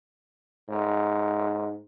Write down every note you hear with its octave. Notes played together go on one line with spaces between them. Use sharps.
G#2